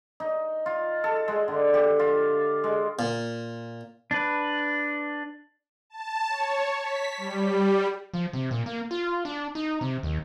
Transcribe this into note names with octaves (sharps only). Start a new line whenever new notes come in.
D#4
F4
A4
G#3
D3
G4
F4
G#3
A#2
D4 B4
A5
C#5
B6
G3
F3
C3
A#2
A#3
F4
D4
D#4
C3
D#2